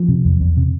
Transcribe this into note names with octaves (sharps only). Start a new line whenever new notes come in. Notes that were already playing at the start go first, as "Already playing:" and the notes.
Already playing: F3
C3
E2
E2
C3